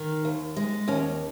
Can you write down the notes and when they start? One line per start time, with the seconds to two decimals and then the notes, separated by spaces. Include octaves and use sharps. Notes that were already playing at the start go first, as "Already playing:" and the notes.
Already playing: D#3
0.25 D#2
0.57 G#3
0.88 D#2 C#4